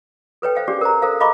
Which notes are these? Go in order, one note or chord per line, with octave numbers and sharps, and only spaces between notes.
A4 B4 C#5 G5
C5 F5 G5
C#4 D4 G4 G#4 D5
A#4 C5 A#5
A4 A#4 C5 F5
D#5 F5 A#5 B5 C#6 D6